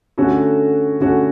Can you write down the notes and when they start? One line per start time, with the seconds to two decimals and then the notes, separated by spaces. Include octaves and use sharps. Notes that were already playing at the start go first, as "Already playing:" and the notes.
0.18 D3 A3 C#4 F#4 A4
1.00 D3 A3 C#4 F#4 A4